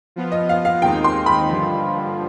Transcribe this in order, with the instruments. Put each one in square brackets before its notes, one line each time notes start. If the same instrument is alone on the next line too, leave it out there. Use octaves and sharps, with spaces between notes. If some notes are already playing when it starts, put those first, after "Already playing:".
[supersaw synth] F3 B3 F4
[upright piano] D#5
F5
F5
[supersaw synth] D#2 D#3 G#3 C4 D#4 [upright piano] G5
[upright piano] C6
B5
[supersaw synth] G2 D3 F3